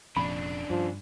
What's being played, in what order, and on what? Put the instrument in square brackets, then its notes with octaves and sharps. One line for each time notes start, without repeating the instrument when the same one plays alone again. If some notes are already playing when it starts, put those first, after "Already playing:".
[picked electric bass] F1 F2 A#2 [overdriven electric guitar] C#3 D4 [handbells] B5
[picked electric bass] G2 [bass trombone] F3